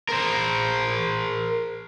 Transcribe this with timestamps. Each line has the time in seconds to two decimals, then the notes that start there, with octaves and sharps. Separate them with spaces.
0.09 A#4 C5